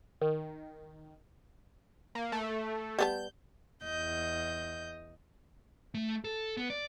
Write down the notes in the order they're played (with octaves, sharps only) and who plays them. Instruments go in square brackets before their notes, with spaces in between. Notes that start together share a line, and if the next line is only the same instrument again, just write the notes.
[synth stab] D#3
[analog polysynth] A#3
A3
[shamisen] G3 B3 A5 [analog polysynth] G6
[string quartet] E2 D#5 G6
[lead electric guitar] A3
A4
B3
D5